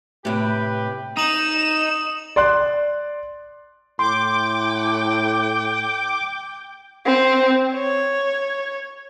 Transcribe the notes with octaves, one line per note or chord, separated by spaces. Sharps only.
A2 C3 G4 B4
D#4 D#6 E7 F#7
D5 C6 F#6
A2 G5 C6 D6
C4
C#5